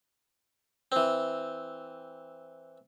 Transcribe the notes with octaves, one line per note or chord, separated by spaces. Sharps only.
E3 C4